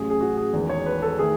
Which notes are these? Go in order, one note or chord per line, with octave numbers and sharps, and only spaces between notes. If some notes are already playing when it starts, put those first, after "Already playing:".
Already playing: A1 A2 F#3 C#4 G#4
G#4
F#4
G#4
E2 D#3 G#3
C#5
B4
A4
D#3 A3 G#4